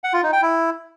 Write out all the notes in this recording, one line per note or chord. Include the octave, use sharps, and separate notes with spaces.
F#5
F4
D#4
G5
E4